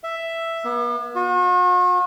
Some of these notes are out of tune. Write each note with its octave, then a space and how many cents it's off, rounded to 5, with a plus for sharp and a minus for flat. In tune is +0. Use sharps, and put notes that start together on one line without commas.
E5 +5
B3 -45
F#4 -45